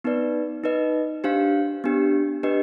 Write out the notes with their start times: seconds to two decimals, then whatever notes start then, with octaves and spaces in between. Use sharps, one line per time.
0.04 B3 D#4 B4 D5
0.64 D#4 B4 D#5
1.24 D4 G4 C5 F5
1.84 B3 D4 G4
2.43 D4 G4 B4 D#5